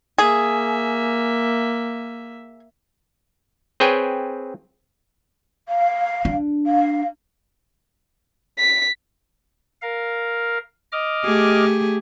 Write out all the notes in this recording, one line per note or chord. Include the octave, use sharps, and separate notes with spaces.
A#3 G#4 E5
C4 G#4 B4 C#5 G5 G#5
F5
D4
F5
B6
A#4 F5
D#5 D6 F6
A3 G4 G#4